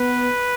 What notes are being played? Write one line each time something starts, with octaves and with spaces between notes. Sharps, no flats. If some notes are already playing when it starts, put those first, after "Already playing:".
Already playing: B3 B4